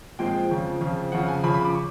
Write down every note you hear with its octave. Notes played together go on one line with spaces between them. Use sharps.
A#2 F3 G#3 C4 G5
F2 C#3 F3
F2 C#3 F3
F2 C#3 F3 F#5
G#5
F2 C#3 F3 B5
B5
D6
C#6